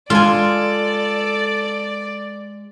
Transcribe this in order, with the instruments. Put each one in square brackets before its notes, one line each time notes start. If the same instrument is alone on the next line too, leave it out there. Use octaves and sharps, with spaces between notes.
[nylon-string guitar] G#3 G#5 [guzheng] F4 [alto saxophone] A4 [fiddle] D5